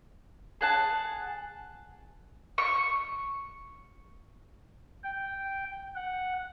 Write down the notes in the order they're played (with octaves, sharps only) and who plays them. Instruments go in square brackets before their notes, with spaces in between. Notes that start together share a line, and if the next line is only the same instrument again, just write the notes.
[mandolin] G#4 F#5 A5
C#6
[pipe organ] G5
F#5